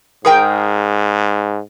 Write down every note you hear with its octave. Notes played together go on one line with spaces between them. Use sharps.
G#2 G#4 A#4 G5